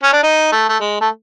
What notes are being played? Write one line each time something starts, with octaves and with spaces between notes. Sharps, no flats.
C#4
D4
D#4
A3
A3
G#3
A3